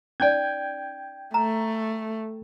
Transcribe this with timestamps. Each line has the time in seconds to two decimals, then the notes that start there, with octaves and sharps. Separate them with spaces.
0.20 C#4 D#4 D5 G5 G6 G#6
1.34 A3 A#5